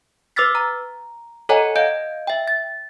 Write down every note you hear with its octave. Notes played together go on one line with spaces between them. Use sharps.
B4 D6 E6 F6 A6 B6
A#5
A4 C#5 D#5 F#5 G#5 A#5
D#5 F5 G6 D7
E5 G5
A6